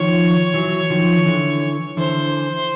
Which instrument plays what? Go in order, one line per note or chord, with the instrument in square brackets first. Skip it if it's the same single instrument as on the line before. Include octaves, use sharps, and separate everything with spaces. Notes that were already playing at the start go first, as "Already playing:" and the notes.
Already playing: [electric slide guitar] D#3 F3 [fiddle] C#5
[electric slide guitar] E3 F#3
D#3 F3
D3 E3
[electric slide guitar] D3 E3 [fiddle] C5